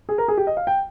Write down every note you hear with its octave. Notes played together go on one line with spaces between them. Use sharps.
G#4
A#4
G#4
G4
D#5
F5
G5